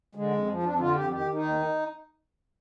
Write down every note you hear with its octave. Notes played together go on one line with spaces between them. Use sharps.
D3 G#3
F2
F3
F2 D4
D3 F4
F2 G4
D#3 G4
D#3
D#4
D#2